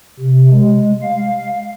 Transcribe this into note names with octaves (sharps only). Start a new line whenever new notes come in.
C3
G#3
F5